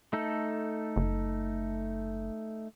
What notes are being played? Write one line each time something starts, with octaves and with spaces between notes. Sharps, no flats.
A3 D#4 A4
F#1